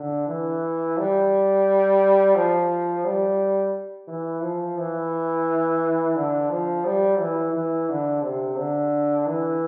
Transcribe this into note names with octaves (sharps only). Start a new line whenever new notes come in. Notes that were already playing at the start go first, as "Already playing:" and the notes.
Already playing: D3
E3
G3
F3
G3
E3
F3
E3
D3
F3
G3
E3
E3
D3
C3
D3
E3